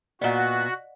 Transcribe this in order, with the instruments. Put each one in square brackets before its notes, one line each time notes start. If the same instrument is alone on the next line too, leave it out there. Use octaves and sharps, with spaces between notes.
[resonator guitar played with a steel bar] A#2 B3 [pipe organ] F#4 [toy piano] D5 D#5 F#5